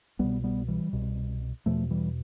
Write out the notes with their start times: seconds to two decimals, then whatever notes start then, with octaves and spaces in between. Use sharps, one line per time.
0.19 C2 B2 G3 B3
0.44 G3 B3
0.68 E3 G3
0.93 C2 B2
1.66 E2 B2 F3 A3
1.91 E3 G3